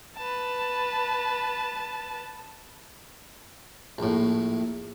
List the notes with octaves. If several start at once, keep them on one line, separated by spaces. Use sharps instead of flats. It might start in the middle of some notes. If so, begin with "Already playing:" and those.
B4 A5
A#1 A2